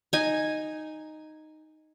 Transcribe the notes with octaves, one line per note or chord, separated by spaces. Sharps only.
D#4 G#5